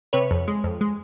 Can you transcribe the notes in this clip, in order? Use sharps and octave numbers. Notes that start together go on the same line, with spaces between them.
C3 B4 C#5
F2
G#3
F2
G#3